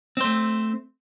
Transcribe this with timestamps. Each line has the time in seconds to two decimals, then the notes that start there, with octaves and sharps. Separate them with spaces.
0.17 C4
0.21 C5
0.24 A3